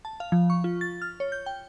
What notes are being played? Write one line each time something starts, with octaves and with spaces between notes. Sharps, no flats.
A5
F5
F3
C#6
F4
A6
F6
C#5
G6
G5